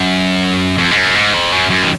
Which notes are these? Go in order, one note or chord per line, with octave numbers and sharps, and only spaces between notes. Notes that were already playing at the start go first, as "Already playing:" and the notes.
Already playing: F#2
F2
G#2
F#2
G#2
F2
F#2
F#2
D#3